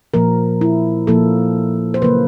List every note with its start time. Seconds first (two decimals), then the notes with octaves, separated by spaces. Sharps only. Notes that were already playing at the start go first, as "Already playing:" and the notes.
0.14 A#2 F3 A#3 A#4
0.61 E4
1.07 A#2 F3 A#3 A4
1.94 C5
2.02 C#3 F#3 A#3 B4